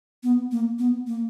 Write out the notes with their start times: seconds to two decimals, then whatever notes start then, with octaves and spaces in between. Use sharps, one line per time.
0.23 B3
0.52 A#3
0.79 B3
1.07 A#3